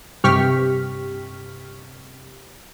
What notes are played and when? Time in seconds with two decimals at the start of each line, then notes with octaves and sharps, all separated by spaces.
0.24 G2 C3 G4 C#6 F6 B6